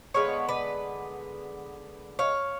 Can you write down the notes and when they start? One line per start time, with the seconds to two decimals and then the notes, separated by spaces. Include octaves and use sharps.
0.14 D3 G#3 B3 C#5 F5
0.49 B4 D5
2.19 C#5 F5